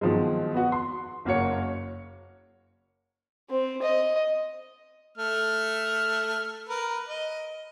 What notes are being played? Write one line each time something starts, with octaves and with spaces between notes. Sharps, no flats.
B2 D#3 F3 F#3 G#3
B3 F#4
C6
F#1 A#3 F#4 C#5 C#7
C4
D#5
A3 F6
A#4 B4
D#5